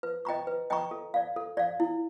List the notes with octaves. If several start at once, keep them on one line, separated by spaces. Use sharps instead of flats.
B4
D#5 G5 A#5 C#6
B4
D#5 G5 A#5 C#6
A4
D5 F5
A4
D5 F5
E4